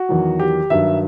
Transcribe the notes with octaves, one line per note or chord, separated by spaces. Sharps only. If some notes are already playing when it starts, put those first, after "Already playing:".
Already playing: F#4
E2 D#3 F#3
G4
G2 D#3 F#3 E5